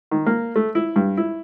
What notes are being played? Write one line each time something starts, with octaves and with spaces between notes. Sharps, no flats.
D#3
A#3
A3
E4
G2
E4